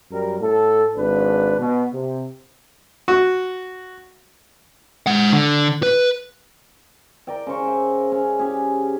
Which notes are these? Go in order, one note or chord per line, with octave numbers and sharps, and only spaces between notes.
F#2 G3 A#4
A2 A4
G#1 D4 B4
B2
C3
F#4
G#3 F#5
D3
B4
A#4 D5 G5
C#3 C5 C#6
E5
C#4
C#4 G4 G#4